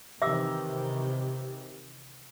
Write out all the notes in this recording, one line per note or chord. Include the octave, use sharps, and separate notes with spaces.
C3 D#3 E3 G4 E5 D6 E6